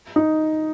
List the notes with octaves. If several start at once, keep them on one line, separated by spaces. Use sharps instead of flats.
D#4